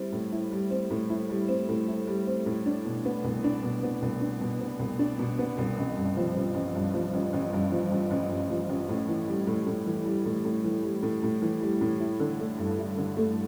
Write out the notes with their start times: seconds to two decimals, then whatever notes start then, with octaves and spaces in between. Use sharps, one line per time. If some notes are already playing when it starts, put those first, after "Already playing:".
Already playing: G3 C4 E4
0.12 A2
0.32 E4
0.51 G3
0.70 C4
0.90 A2
1.10 E4
1.29 G3
1.48 C4
1.69 A2
1.88 E4
2.07 G3
2.27 C4
2.46 A2
2.66 D4
2.85 B2
3.05 B3
3.24 C2
3.44 D4
3.63 B2
3.83 B3
4.02 C2
4.21 D4
4.41 B2
4.60 B3
4.79 C2
4.99 D4
5.19 B2
5.39 B3
5.58 C2
5.77 A1
5.96 G2
6.17 F3
6.36 A1
6.54 A1
6.75 G2
6.94 F3
7.14 A1
7.33 A1
7.53 G2
7.72 F3
7.91 A1
8.11 A1
8.30 G2
8.50 F3
8.69 A1
8.89 A2
9.08 E3
9.28 G3
9.47 A2
9.66 A2
9.86 E3
10.05 G3
10.25 A2
10.45 A2
10.64 E3
10.83 G3
11.02 A2
11.23 A2
11.42 E3
11.61 G3
11.81 A2
12.00 E4
12.20 D3
12.39 A3
12.58 G2
12.78 E4
12.98 D3
13.17 A3